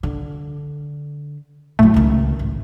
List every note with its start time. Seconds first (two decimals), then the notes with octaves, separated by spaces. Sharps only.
0.03 D3
1.79 A2 F#3 A3
1.94 C#2 D#3
2.39 A1